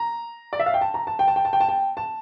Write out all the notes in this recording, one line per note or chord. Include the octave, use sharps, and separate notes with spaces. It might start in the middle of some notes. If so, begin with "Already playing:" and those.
Already playing: A#5
D5
E5
F5
G5
A5
A#5
A5
G5
A5
G5
A5
G5
A5
G5
A5